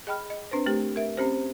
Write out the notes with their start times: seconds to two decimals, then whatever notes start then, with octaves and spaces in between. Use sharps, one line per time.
0.07 G#4 D#5 G5 B5 F6
0.30 D#5
0.51 C4 D4 B4 C5
0.66 A3 G4 A#4
0.96 A#4 E5
1.17 C4 C#4 G4 C5